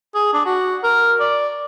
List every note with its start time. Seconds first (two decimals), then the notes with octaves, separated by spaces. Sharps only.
0.15 G#4
0.33 D4
0.46 F#4
0.83 A#4
1.20 D5